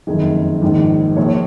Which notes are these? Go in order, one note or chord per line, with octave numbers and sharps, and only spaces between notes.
F#1 F2 D#3 G#4
A#1 G#2 D#3
A#1 A#2 C#5